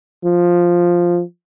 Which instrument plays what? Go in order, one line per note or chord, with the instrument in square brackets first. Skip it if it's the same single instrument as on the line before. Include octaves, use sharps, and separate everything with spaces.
[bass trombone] F3